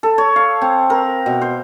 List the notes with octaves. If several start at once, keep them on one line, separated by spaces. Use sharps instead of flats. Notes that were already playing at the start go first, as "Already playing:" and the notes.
A4
C#5
F5
C4
A#4
B2
C5